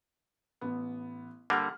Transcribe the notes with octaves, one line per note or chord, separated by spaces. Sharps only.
A1 B3
D3 G3 A#3 F#5 F6